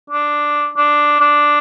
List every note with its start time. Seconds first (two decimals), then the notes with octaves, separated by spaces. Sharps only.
0.10 D4
0.77 D4
1.20 D4